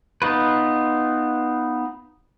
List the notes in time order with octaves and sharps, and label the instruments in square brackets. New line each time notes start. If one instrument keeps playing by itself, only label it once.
[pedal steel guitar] B3 D#4 F4 B4